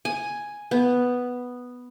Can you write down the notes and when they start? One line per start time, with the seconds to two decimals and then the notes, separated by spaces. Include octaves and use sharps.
0.05 G#5
0.71 B3